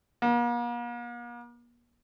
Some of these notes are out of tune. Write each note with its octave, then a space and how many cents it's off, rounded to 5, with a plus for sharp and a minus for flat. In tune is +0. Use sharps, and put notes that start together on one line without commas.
A#3 +45